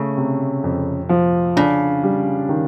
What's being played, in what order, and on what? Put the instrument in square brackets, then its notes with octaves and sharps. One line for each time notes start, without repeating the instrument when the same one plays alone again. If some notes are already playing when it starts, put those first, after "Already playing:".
Already playing: [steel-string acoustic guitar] C#3 [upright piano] A3
[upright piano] C3
F2
F3
[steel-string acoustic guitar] C#3 [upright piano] D4
[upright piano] G3
D#3